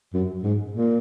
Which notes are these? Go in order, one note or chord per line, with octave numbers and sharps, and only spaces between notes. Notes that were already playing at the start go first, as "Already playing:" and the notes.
F#2
G#2
A#2